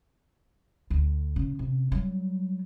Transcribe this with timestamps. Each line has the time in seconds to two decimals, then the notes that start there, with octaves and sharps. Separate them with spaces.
0.90 D2
1.36 C#3
1.59 C3
1.92 F#3 G3